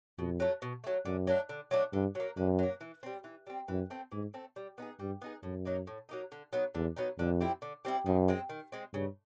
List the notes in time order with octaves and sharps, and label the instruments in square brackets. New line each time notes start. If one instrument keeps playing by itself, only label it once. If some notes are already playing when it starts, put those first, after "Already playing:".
[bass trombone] F2 [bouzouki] B2
[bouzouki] F#3 A3
B2
F#3 A3
[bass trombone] F#2 [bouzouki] D3
[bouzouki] F#3 A3 D4
D3
F#3 A3 D4
[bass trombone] G2 [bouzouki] D3
[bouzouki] F#3 A#3
[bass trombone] F#2 [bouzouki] D3
[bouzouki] F#3 A#3
E3
G3 C4
E3
G3 C4
[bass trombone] F#2 [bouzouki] E3
[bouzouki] A3 C4
[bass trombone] G#2 [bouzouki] E3
[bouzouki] A3 C4
G3
B3 D#4 G#4
[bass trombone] G2 [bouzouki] G3
[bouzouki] B3 D#4 G#4
[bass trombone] F#2 [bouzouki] A2
[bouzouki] F#3 A#3 D#4
A2
F#3 A#3 D#4
D3
F#3 B3 D#4
[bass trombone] E2 [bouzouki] D3
[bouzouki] F#3 B3 D#4
[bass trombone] F2 [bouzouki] D3
[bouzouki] G3 C4 E4
D3
G3 C4 E4
[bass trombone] F#2 [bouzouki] D#3
[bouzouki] G#3 C4
D#3
G#3 C4
[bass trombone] G2 [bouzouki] C#3